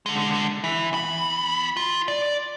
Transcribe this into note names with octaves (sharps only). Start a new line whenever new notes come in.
D3 G#3
E3
E2 B5
F4
D5